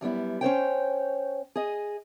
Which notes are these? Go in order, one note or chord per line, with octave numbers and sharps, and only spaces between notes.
F#2 G3 B3 E4
C#4 C5 C#5 G5
G#4 D#5